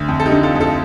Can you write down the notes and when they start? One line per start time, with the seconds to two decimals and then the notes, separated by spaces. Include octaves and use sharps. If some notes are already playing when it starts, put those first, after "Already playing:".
Already playing: D2
0.08 F2
0.20 A4
0.25 D#4 G4
0.32 D3
0.43 F4 A4
0.55 F2
0.60 F4 A4